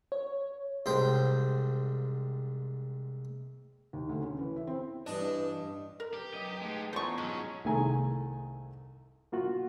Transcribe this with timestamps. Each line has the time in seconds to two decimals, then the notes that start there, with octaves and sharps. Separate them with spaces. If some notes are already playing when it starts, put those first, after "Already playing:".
0.12 C#5
0.86 C2 G#2 C5 G5
3.93 D#2
4.09 D2
4.22 C#4
4.39 E3
4.56 E4
4.67 C4
5.06 G2 E3 D4 D#5
6.00 A#4
6.14 G4 B4
6.34 F#2 D#5
6.61 G#3 A3 D#4 B4
6.93 E2 F4 C5 A5 A#5 C#6
7.18 G#2 F#3 G#3 C#4
7.64 C2 D#3 A3 G#4 G#5 A#5
9.32 A#3 F4 F#4